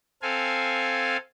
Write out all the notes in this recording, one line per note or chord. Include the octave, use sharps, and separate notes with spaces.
C4 A4 F5 G#5